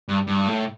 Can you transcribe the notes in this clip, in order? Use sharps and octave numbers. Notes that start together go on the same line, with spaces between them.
G2
G2
A2